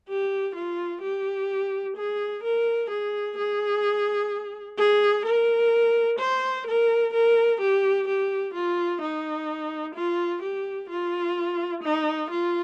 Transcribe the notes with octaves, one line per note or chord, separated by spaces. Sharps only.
G4
F4
G4
G#4
A#4
G#4
G#4
G#4
A#4
C5
A#4
A#4
G4
G4
F4
D#4
F4
G4
F4
D#4
F4